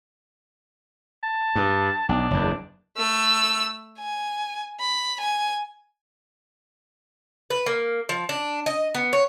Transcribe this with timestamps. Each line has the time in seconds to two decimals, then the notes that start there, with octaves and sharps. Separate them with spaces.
1.23 A5
1.55 G2
2.09 B1 D4
2.31 F#1 E2
2.97 A3 E6
3.99 G#5
4.80 B5
5.20 G#5
7.50 B4
7.66 A#3
8.09 F3
8.29 D4
8.66 D#5
8.95 B3
9.13 C#5